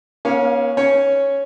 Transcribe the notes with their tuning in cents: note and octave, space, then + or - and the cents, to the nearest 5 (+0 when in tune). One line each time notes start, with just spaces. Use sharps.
A#3 +45 C#4 +0 F5 +0
C#4 +0 C#5 +0